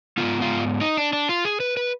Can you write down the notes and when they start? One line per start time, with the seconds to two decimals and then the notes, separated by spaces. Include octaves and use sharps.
0.18 D#3 B3 F4
0.22 G#2
0.42 F4
0.81 D#4
0.97 D4
1.13 D4
1.29 F4
1.45 G#4
1.60 B4
1.77 B4